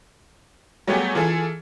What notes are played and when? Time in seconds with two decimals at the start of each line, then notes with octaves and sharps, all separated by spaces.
0.87 F#3 G3 A3 B3 G4 G#4
1.15 E3 F4 G#4 A4